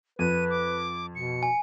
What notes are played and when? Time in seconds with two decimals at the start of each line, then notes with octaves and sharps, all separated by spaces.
0.19 F2 B4 D#7
0.50 D6
1.15 B2 C#7
1.43 G#5